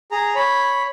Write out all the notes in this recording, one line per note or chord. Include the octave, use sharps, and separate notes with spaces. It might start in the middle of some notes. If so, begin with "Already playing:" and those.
G#4 A#5
C#5 B5